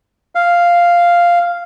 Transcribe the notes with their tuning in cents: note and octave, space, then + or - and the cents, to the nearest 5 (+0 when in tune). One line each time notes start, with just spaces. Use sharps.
F5 -5